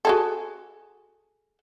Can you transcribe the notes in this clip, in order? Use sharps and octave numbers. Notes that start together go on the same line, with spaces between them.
F#4 G#4 A4